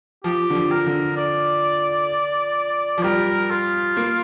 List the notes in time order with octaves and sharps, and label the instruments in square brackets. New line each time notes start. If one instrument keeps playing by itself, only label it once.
[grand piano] F3 [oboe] G4
[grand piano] D3
F3
[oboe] A#4
[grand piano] D3
[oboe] D5
[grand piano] F3
[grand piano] G3 [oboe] A#4
[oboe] F4
[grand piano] A#3